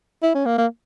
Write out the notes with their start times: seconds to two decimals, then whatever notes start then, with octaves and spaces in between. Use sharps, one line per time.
0.22 E4
0.35 C#4
0.46 A#3
0.58 A#3